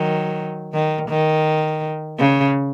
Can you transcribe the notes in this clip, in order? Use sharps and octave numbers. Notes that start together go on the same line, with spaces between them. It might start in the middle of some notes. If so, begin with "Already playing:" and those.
Already playing: D#3 F#3
D#3
D#3
C#3